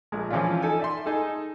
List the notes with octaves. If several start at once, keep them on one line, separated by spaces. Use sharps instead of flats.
A#1 G#3
E3 F3 C#4 D4 F4
D#4 A4 G#5
D5 E5 C6
D#4 G#4 A4